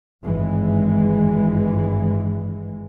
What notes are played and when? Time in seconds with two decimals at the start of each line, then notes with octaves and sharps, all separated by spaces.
0.24 G#1 G2 E3 G#3